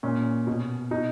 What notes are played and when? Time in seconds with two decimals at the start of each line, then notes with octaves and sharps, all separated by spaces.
0.03 A#2 C#4
0.47 B2
0.91 B2 D#4